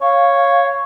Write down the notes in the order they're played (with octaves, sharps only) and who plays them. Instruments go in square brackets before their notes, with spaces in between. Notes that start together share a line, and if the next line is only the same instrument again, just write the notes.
[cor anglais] C#5 [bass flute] F5